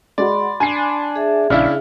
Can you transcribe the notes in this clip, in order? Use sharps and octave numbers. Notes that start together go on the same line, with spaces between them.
G#3 F#4 D5 B5 C6
D4 G#5 C7
G#4 E5
A#1 C#3 D4 E4 F6